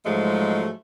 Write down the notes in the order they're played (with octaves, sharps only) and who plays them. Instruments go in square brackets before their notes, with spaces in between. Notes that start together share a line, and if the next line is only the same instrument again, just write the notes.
[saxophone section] G#2 F3 F#3 G#3 A3